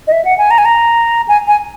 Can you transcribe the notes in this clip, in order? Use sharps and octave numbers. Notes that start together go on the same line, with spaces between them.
D#5
E5
F#5
G#5
A#5
G#5
A#5
G#5
G#5